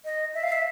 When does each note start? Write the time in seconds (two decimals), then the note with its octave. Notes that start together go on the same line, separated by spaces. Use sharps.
0.05 D#5
0.34 E5
0.43 F5
0.52 E5